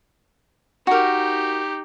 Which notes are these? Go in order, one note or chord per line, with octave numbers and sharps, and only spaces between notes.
D#4 F#4 G4 A#4